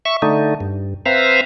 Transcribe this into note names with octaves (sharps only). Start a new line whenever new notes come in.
E5 C#6
D3 A3 D#4
G2
C4 B4 C5 E5 F5 A#5